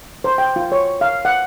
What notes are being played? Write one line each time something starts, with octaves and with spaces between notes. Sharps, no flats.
C5
G5
F4
C#5
F5
F#5